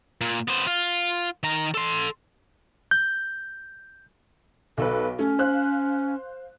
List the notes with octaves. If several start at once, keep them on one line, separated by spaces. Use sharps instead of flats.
A#2
B3 C5
F4
D#3 A#5
A4 C6
G6
B1 A4 B4
A3 C#4
C5 F5 F#6